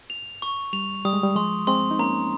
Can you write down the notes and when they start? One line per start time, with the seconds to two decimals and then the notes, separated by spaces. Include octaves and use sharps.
0.10 F7
0.42 C#6
0.73 G3 F7
1.05 G3 D#6
1.13 G#3
1.23 G3
1.35 F3 G#3 C6
1.67 G#3 C4 C6
1.91 D#4
1.99 A#3 C#4 A#5